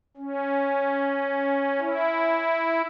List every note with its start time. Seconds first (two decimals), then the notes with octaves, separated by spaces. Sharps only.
0.17 C#4
1.80 E4